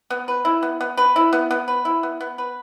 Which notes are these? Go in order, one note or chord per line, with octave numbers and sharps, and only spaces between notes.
B3
B4
E4
B3
B3
B4
E4
B3
B3
B4
E4
B3
B3
B4